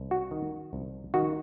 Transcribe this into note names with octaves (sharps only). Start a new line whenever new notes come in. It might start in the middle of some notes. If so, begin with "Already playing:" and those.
Already playing: C2
F#4
D#3
C2
D#3 F#4